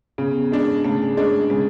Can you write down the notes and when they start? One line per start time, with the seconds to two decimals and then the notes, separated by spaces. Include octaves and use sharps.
0.18 C#3 B3
0.52 G#3 D4
0.85 C#3 A3
1.17 G#3 D4
1.50 C#3 G#3